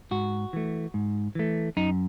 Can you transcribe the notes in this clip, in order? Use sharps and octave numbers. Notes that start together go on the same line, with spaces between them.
G#2 F#4
E3 A3
G#2
E3 A3
F#2 D#4